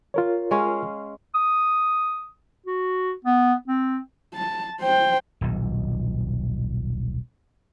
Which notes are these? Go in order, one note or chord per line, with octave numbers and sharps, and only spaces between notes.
F4 A#4 C#5
G#3 C#4 F5
D#6
F#4
B3
C4
A5
C5 G5
D#1 B1